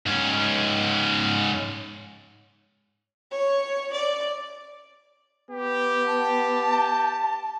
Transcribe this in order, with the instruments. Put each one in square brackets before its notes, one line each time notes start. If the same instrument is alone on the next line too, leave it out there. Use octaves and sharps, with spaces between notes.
[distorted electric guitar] G#2 C#4
[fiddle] C#5
D5
[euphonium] B3 [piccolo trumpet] G4
[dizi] A5